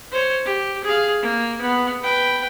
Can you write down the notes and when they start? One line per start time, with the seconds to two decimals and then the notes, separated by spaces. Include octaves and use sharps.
0.11 C5 C#5
0.45 G4
0.84 G#4 F5
1.23 A#3
1.61 B3
2.02 B4 G5